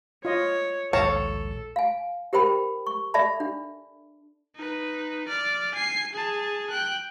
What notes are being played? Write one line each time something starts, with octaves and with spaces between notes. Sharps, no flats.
F4 C#5 D#5
A#1 D#2 G#2 A4 C#5 F5 A5 A#5
F5 G#5
G4 A#4 C5 G5 B5
C#6
A4 D5 E5 A5 B5
D4
D#4 B4
D5 F6
G#5 C7
G#4 A5
G5 F#6